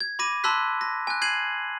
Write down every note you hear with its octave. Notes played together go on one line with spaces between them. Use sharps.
G#6
B5 D6 A#6 D#7
A5 B5 C6 E6 F#6 B6
A#6
G#5 F#6
G6 G#6 C7 D#7 F#7